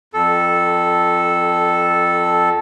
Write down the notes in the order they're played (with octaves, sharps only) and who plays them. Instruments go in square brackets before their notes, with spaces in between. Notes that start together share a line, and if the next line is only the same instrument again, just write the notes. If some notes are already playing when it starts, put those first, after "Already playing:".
[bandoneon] F2 A4